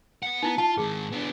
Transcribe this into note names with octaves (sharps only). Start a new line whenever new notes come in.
B3 F#5
B3 D#4 E4
F4 A5
G#2 D#3 G#4
B3 D4